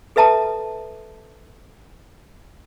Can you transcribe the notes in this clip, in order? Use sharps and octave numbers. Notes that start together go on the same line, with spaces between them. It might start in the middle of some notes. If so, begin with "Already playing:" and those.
A4 B4 E5 A5 A#5 D#6